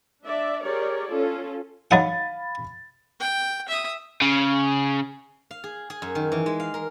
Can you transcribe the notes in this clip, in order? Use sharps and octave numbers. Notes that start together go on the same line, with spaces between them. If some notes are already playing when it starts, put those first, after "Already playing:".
D4 D5 E5
G4 G#4 A#4 C#5 D5
C#4 F4 A4
F#3 D#4 F5 F#5 B5 A6
G5
E5 D#6
C#3
F5
G#4
G#4
F#2
D#3
E3
G#3
F5
A#4